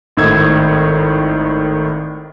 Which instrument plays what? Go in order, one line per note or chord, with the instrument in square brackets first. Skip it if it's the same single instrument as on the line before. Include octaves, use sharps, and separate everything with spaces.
[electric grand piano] G#1 A2 D#3 E6 G#6